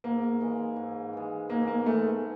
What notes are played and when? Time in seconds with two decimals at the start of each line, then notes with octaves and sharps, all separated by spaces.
0.04 G#2 A#3
0.40 E3 G#3
0.76 G#2
1.13 E3 G#3
1.49 G#2 A#3
1.68 A#3
1.86 E3 G#3 A3